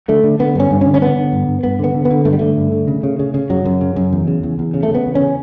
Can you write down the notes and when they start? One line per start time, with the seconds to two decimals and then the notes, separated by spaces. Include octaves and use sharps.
0.08 D3 A3
0.24 D3
0.39 D3 B3
0.55 G2 C#4
0.71 G2
0.81 C#4
0.86 D3
0.94 C#4
1.01 D3 B3
1.17 D3
1.32 G2
1.48 G2
1.63 G2 B3
1.79 D3 B3
1.94 D3
2.05 B3
2.11 D3
2.25 G2 A3
2.33 G3
2.39 D3 A3
2.57 G2
2.72 D3
2.88 C#3
3.03 C#3
3.19 C#3
3.34 C#3
3.50 F#2 F#3
3.65 F#2
3.81 C#3
3.96 F#2
4.12 E2
4.27 C#3
4.43 E2
4.59 E2
4.74 C#3
4.83 A3
4.90 C#3 B3
5.06 E2
5.15 C#3 C#4